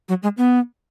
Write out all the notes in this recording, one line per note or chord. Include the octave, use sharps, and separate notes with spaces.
F#3
G#3
B3